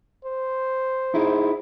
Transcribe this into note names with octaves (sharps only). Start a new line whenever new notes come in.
C5
D#4 E4 G#4